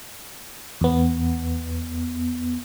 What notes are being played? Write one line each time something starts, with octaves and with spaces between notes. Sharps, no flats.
E2 B3